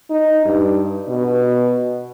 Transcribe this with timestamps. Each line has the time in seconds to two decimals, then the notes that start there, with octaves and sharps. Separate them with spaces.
0.10 D#4
0.45 G2
1.09 B2